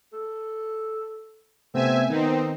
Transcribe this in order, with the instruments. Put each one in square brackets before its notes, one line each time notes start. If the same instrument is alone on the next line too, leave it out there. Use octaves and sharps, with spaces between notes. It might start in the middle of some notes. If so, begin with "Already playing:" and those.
[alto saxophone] A4
[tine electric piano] C3 A3 B3 [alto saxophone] C4 [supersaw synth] E5 G#5
[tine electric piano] D#3 [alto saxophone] B3 [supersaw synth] C4 D#4